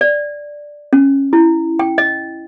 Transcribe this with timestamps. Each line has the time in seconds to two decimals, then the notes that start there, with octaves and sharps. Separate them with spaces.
0.01 D5
0.93 C#4
1.33 E4
1.79 G5
1.98 D#5